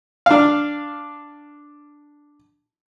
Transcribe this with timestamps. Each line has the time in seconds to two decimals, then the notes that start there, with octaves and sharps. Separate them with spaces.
0.26 D4 F5